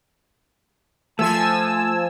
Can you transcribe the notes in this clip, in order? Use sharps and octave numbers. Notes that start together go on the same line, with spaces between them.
F3 A3 G#5 A5 E6